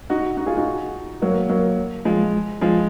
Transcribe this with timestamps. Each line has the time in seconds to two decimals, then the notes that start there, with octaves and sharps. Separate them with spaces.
0.10 D#4 F#4
0.37 D#4 F#4
0.46 F4 G#4
0.57 D#4 F#4
1.22 F#3 A#3
1.49 F#3 A#3
2.05 F3 G#3
2.61 F3 G#3